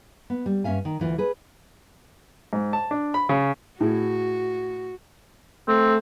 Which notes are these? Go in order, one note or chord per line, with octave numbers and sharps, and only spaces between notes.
B3
G3
G2 C#4 E5 F5 G#5
D#3
D2 E3 F4
G#4 B4
G#2
A5
D4
B5
C#3
A2 E4 F#4 G#4
A3 C4